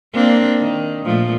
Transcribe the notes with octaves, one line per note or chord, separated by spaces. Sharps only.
A#3 C4 D4
D#3
A#2 F3 A3